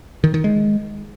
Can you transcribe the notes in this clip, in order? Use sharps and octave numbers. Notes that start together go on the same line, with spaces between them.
D#3
D#3
G#3